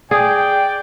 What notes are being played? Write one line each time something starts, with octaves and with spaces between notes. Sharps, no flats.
G#4 D5 G5